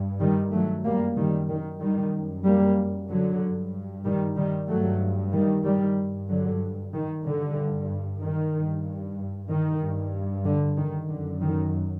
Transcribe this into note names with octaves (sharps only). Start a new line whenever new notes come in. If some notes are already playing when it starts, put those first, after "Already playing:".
Already playing: G2
D#3 G3
F#3 A3
F#2 G3 A#3
D#3 G3
D#3
D#3 G3
F#2
G3 A#3
D3 F#3
G2
D#3 G3
D#3 G3
G2 F#3 A3
D#3 G3
D#3 G3
G2
D3 F#3
D#3
G2 D3
D#3
G2
D#3
G2
D3
D#3
F#2 D3
D#3